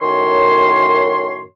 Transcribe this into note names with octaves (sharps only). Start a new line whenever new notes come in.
F#2 A2 D#3 C#5 C6